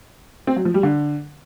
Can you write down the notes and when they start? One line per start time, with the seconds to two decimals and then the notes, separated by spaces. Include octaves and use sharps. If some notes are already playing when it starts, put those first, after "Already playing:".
0.47 C4
0.56 F#3
0.65 F3
0.74 G3
0.83 D3